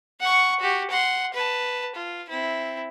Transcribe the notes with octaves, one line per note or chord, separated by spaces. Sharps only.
F#5 C#6
F#4 G4
F#5 C6
B4 A5
F4
C4 E4